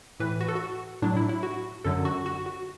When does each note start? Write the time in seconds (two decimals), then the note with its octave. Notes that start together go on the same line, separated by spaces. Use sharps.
0.20 A2 E3 B4
0.41 F#4
0.48 A4
0.55 F#4
1.02 A2 F#3 D4
1.17 E4
1.29 E4
1.43 F#4
1.84 F#2 D3 F#3 A4
2.05 F#4
2.26 F#4
2.46 F#4